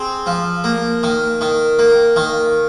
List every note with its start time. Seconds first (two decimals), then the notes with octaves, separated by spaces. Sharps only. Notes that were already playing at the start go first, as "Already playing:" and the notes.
Already playing: C4 G#4
0.26 F3
0.64 A#3
1.03 D#3
1.41 D#3
1.79 A#3
2.16 D#3